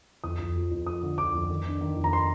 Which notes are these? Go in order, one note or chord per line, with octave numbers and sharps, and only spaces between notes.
F2 D#6
F2
F3
F2
F3 D#6
D3
F3 D6
F2
D#3
D4
D#3
F2
A#5
C6